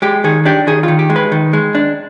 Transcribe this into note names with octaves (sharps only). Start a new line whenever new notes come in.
G#3 G4
D#3 G#4
D4 G4
D#3 G#4
D#3 F4
G4
G#3
B4
D#3
G#3
D4